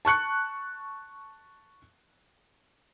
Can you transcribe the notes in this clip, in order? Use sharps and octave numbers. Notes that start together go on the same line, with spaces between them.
A5 C#6 F#6 C#7